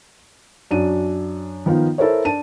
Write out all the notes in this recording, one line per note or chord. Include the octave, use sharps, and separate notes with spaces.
F#2 D4 F#4 D#7
D#3 F3 B3 D#4 F4
E4 A4 A#4 C5 C#5
D4 A5 D#7